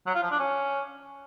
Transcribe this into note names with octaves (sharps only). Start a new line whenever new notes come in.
F#3
F4
F3
D4
C#4